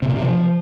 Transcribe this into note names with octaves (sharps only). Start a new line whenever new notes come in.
C3
A#2
C3
F3